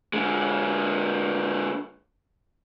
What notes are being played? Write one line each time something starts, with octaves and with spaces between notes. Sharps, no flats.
D3 G#3